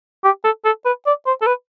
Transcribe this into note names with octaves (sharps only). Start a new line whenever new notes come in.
G4
A4
A4
B4
D5
C5
A4
B4